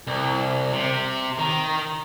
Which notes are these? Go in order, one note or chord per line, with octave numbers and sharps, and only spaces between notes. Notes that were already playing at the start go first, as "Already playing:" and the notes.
C2
C3
D#3